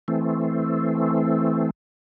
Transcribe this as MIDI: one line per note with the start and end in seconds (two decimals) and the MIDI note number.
0.08 1.70 52
0.08 1.70 57
0.08 1.70 60